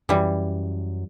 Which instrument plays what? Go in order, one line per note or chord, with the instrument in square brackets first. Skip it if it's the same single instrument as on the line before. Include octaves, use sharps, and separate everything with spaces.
[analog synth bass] F#2 [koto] E3 G3